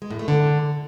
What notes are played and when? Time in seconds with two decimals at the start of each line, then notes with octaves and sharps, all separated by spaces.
0.02 G#3
0.10 A2
0.19 A3
0.28 D3